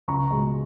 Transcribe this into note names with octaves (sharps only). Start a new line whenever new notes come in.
C#2 A#5 C#6
B2 G#3